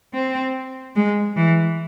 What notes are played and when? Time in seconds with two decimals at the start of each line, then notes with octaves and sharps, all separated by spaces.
0.14 C4
0.96 G#3
1.37 E3